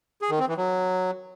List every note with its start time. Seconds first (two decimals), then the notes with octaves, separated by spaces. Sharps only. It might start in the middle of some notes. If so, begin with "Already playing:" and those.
0.22 G#4
0.30 D#3
0.39 C4
0.48 E3
0.57 F#3